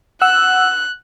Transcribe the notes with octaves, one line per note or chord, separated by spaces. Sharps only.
F#5 E6 F#6